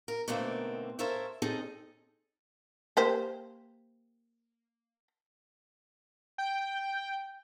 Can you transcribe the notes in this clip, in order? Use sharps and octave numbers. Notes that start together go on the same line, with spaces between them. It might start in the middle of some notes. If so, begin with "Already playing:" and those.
A#4
B2 D3 D#3 A3 A#3 C4
A4 A#4 C5 C#5 E5 F5
C4 C#4 D#4 G#4 A4 D#5
A#3 G4 C5
G5